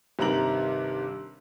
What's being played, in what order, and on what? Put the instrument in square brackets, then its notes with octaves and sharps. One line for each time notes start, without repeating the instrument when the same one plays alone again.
[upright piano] G1 C3 D#3 A#4 A#5 F#7